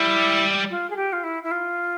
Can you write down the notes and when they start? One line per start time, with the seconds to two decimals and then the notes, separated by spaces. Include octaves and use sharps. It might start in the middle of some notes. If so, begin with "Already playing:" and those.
Already playing: G3 E4
0.70 F4
0.90 G#4
0.96 G4
1.12 F4
1.23 E4
1.43 E4
1.51 F4